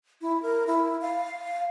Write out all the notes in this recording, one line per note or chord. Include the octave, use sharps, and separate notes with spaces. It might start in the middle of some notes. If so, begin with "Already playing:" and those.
E4
A#4
E4
F5